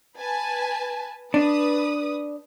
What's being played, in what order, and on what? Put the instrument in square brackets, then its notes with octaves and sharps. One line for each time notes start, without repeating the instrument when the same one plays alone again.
[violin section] B4 G#5 A5
[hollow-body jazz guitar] D4 [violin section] B4 D#6